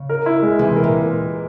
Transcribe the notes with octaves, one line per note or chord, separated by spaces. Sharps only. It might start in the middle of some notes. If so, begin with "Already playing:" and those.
Already playing: C#3
A#4
E4
G#3
C3 E3
A#4
A#2